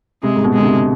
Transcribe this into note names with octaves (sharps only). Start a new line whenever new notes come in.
C3 G#3
G#2
B2
D3 G#3
C3